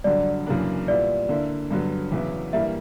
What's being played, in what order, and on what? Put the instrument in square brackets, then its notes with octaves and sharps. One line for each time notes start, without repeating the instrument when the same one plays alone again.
[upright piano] G2 D3 F#3 [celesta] D5
[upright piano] F#2 C#3 E3 A#3 D4
[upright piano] A#2 G3 B3 E4 [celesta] D5
[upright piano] D3 A#3 E4
G2 D3 F#3 B3
E2 C#3 F#3 B3 E4
[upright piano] G2 E3 G3 A#3 [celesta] E5